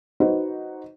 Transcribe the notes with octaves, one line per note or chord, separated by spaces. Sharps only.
D#4 F#4 B4 C5